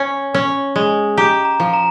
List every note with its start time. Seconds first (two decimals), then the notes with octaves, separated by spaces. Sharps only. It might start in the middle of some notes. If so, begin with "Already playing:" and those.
Already playing: C#4
0.34 C#4
0.76 G#3
1.17 G4 A#5
1.45 A#5
1.60 F3
1.73 A#5